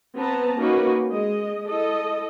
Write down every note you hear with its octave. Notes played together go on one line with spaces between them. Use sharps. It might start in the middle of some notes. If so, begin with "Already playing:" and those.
B3 C4 B4 A5 A#5
A#3 C#4 D#4 F#4 B4
G#3 D#5
E4 A4 D#5